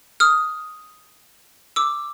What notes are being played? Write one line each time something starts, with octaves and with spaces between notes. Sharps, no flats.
D#6 F6
D6 E6